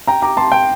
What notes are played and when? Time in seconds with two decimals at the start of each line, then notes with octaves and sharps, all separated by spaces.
0.08 G5 A#5
0.22 A#5 D6
0.37 A5 C6
0.52 G5